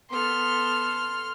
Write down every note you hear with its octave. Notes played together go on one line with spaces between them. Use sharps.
B3 A4 C6 F6